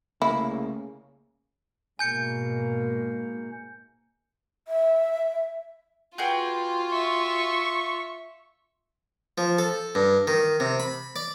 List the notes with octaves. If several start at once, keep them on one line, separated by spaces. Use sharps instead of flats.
C2 C#3 A3 A#3 E4
G#2 B2 A#3 G#5 G6 C#7
E5
F4 F#4 G#4 B4 G5
E5 C#6
F3
A4
G2
D#3
C3
B5
D5